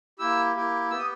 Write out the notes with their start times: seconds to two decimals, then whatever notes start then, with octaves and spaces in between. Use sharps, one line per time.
0.19 A#3 E4 G4 E6
0.55 A#3 E4 G4
0.91 B3 G4 E6
0.99 D#6